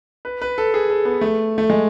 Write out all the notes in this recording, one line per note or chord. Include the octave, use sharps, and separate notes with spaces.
B4
B4
A4
G#4
A4
B3
A3
A3
G#3